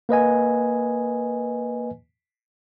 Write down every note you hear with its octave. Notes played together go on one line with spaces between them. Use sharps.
A#3 B4 D#5 G#5